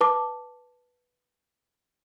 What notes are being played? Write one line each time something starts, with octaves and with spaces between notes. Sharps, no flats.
B4 A5 D6